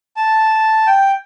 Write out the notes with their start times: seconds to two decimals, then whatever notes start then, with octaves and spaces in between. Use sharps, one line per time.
0.17 A5
0.87 G5